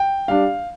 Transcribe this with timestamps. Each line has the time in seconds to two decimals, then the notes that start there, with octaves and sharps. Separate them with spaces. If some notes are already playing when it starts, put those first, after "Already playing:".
Already playing: G5
0.28 G3 D4 F5